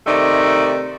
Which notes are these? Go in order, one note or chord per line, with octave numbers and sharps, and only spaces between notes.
C3 D#3 A3 D#4 D5